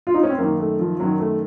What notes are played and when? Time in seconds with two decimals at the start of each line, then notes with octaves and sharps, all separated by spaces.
0.07 F4
0.14 D#4
0.23 C#4
0.30 C4
0.38 F#2 D#3 A#3
0.60 A3
0.79 F3
1.00 F#2 D#3 F#3
1.19 A3